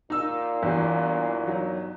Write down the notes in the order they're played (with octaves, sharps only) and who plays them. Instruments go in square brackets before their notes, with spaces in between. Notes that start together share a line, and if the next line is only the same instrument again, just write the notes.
[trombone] A#2 [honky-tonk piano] D#4 E6
[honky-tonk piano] G1 [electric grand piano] E3 F#4
[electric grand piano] F#3 D#4